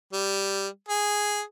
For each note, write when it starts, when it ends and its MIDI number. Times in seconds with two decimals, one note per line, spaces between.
0.13 0.68 55
0.88 1.42 68